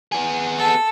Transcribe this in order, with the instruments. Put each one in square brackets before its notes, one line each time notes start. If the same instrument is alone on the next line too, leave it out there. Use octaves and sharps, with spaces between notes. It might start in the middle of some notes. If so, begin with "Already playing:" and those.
[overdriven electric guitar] B3 G#4
[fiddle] A4 E6